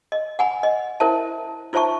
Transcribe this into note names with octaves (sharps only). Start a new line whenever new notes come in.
D#5
F#5 G#5 B5
D#5
E4 A#4 C5 E5 A5
D#4 F4 C5 E5 A5 C#6